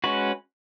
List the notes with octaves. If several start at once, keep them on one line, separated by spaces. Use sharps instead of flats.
G#3 C#4 F#4 B4